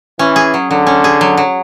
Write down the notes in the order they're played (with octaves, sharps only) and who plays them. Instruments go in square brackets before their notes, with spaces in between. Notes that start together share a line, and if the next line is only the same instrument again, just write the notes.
[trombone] E3 [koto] C#4
[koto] G#4
F#3
[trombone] D3 [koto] F#3
[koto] C#4
G#4
F#3
F#3